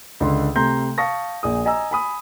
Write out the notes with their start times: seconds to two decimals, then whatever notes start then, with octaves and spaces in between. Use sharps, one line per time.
0.20 C#2 D3 C6
0.56 C3 A3 A#5 C6 G6
0.98 F5 A5 C#6 D#6 A#6
1.43 A#1 G#4 D#6
1.65 D#5 G#5 A#5 E6
1.91 G#5 B5 D#6